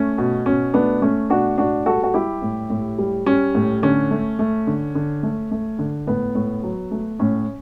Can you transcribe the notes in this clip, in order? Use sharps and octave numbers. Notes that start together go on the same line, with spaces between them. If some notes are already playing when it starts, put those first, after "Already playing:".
Already playing: A3 C#4
B2
B2 C#4
A3 B3 D4
A3 C#4
B2 D4 F#4
A2 D4 F#4
G3 F#4 A4
F#4
G3 E4 G4
A2
A2
G3
G3 C#4
A2
D3 C#4
A3
A3
D3
D3
A3
A3
D3
A2 B3
A2
F#3
A3
A2 C#4